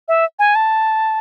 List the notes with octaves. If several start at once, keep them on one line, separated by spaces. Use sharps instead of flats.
E5
G#5
A5